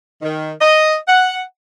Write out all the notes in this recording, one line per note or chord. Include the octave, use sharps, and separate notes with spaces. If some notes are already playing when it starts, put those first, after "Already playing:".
D#3
D#5
F#5